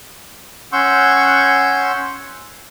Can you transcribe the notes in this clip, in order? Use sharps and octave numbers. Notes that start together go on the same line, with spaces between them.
C#4 F#5 C6 C#6 E6 G6